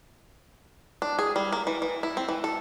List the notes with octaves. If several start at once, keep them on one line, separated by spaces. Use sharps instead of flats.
D4
G#4
G3
A#3
E3
E3
E4
C4
E3
A4